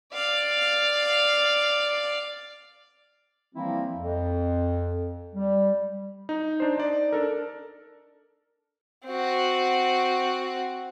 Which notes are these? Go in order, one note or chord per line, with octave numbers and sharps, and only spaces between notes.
D5 F5
E3 F3 G3 A#3 C4 E4
F2
G3
D#4
D4 C5
D#4 D5
D4 A4 A#4
C4 F#4